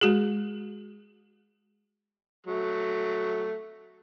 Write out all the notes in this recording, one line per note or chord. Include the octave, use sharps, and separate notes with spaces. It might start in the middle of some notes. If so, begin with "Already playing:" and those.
G#3 F#4 G#4
F#3 A3